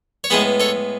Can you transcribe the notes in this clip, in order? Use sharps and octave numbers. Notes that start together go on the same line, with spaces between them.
C#5
A2 G#3 B3 G#4 B4
A4 C#5